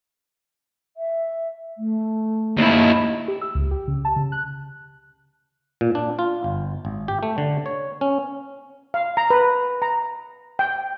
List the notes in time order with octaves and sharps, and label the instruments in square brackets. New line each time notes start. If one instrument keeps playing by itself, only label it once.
[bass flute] E5
A3
[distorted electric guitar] D#2 E4
[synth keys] G4
E6
C#2
G4
C#3
A5
C#3
F#6
[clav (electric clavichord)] A#2
D4
F4
G1
G#1
G4
A3
D3
C#5
C#4
[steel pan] F5
A#5
B4
A#5
G5